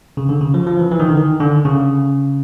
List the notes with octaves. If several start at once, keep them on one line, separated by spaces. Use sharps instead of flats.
C#3
D3
C#3
F3
F3
E3
E3
D#3
D3
D#3
D3
C#3